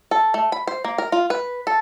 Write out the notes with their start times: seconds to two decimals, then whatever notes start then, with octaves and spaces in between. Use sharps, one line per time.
0.11 A4
0.34 A3
0.52 B5
0.67 C5
0.85 A#3
0.98 A#4
1.12 F4
1.30 B4
1.67 A4